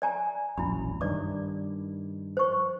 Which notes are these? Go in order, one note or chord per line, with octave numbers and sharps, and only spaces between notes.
D5 G#5 A#5
E1 A#1 F#2 E4 B5
G2 D#3 D5 D6
C5 C#6